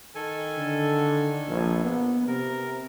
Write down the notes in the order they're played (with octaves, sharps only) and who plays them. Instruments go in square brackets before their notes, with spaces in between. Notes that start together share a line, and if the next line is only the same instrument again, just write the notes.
[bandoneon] D#3 A4 G#5
[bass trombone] D3
A#1
B3
[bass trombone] C3 [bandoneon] A#4